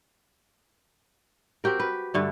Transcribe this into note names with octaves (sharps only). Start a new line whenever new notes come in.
C4 F#4 G4 A#4
B4
G2 D3 A3